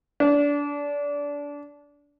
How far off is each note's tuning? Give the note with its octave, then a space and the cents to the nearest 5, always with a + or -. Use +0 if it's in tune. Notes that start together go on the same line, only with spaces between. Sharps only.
D4 -25